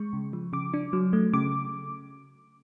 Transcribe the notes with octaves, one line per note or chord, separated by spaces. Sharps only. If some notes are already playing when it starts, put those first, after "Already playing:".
Already playing: G#3 C#6
C#3
F3
C#3 D6
D4
F#3
A3
C#3 D6